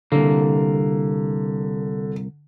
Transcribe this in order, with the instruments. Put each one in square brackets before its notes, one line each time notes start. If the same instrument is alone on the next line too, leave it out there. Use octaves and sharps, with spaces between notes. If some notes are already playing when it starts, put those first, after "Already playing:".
[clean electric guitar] C2 A#3 [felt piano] D3